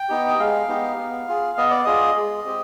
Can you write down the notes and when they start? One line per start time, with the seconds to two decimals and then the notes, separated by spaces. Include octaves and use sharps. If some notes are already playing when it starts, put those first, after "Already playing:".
Already playing: G5
0.09 B3 D#4 G4
0.28 D#5
0.39 G#3 F5
0.69 B3 D#4 G4
0.98 B3
1.28 F4 G#4
1.58 B3 D#5
1.71 D5
1.84 F4 G#4 D#5
2.17 G#3
2.46 C4 G4